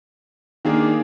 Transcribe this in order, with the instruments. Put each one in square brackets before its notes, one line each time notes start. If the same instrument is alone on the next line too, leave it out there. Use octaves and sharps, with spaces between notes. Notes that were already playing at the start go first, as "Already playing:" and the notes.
[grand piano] D#3 A#3 D4 G#4